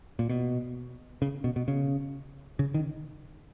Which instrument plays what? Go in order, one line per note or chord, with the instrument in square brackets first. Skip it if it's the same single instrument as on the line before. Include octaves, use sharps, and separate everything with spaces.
[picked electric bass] A#2
B2
C#3
B2
B2
C#3
C#3
D#3